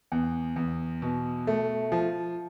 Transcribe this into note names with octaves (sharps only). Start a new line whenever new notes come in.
E2
E2
B2
A3
F3